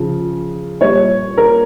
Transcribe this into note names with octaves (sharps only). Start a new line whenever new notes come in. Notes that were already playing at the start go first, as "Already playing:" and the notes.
Already playing: C#3 F3
A#2 G3 C#5
A#4